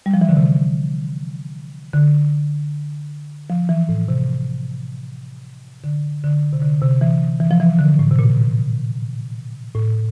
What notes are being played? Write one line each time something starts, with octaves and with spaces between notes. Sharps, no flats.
G3
F3
E3
D3
C3
D3
F3
E3
A2
C3
D3
D3
C3
D3
C3
E3
E3
F3
E3
D3
A2
C3
A#2
A2